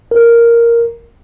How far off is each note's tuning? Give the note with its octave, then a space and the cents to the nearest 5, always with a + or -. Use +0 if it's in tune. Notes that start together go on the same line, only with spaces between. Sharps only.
A#4 +0